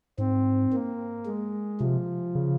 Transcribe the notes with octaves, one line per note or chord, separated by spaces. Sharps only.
G#2 C4
A#3
G#3
C3 F3
C#3